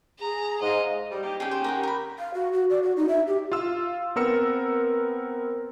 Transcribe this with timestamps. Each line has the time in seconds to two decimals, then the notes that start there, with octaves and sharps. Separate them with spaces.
0.20 G#4 A#5
0.61 G#2 D#5 F5
1.11 G3
1.23 A#3 D#4 G4
1.40 D#2 C#4 G4 G#4 G5
1.51 C5
1.64 A#4 F#5 G5
1.83 A#4 B5
2.19 F5
2.34 F#4
2.52 F#4
2.70 D5
2.83 F#4
2.97 D#4
3.09 E5
3.27 G4
3.52 F4 F5 E6
4.16 B3 C4 A#4 E6 C#7